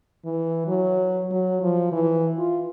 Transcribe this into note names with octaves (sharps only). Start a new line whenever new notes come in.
E3
F#3
F#3
F3
E3
F4